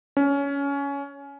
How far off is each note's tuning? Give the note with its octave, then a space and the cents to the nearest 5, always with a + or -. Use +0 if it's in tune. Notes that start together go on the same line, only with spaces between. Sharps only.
C#4 +20